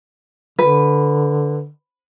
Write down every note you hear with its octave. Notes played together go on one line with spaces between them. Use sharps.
D3 B4